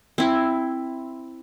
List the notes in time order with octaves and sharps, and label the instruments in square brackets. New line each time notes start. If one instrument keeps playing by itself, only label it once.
[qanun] C4 E4